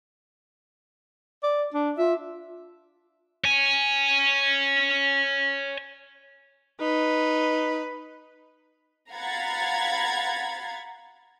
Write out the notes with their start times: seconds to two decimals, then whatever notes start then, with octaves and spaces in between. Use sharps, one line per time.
1.43 D5
1.74 D4
1.98 F4 E5
3.44 C#5 G#5
6.81 D#4 B4
9.12 F5 F#5 A#5 B5 G#6 A6